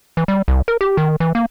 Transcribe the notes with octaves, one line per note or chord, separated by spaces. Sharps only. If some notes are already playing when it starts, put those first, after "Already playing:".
E3
G3
C2
A#4
G4
D#3
E3
A#3